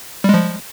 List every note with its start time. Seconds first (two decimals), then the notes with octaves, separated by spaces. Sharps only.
0.24 G3
0.29 G#3
0.34 F3